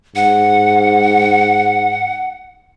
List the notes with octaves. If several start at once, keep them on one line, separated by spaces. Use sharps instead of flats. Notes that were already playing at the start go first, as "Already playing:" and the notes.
G#2 F#5